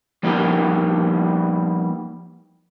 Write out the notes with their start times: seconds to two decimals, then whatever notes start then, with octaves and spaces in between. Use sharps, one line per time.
0.23 F3 G3 A#3 B3 D#4 G4